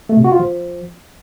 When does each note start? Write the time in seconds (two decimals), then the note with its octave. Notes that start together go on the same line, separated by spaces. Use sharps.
0.09 A3
0.17 C3
0.24 F#4
0.32 F4
0.39 F3